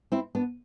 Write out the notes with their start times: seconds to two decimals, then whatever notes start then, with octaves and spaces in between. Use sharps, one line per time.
0.12 C4 E4
0.35 B3 D4